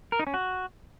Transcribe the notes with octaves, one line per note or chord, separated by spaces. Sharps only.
A#4
D#4
C#4
F#4